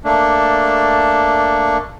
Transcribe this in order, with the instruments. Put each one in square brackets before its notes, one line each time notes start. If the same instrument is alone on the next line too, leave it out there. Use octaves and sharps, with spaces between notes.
[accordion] A3 A#3 D4